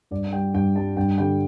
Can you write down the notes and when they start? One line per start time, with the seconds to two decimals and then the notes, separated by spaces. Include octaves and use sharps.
0.11 G2 D5
0.33 G3 G5
0.54 G2 G5
0.75 G3 A5
0.97 G2 G5
1.18 D3 G3 G5